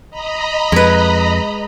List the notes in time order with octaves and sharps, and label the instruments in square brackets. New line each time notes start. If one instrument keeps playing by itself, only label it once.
[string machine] D#5 A#5 B5
[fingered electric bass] F2 [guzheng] G#3 B4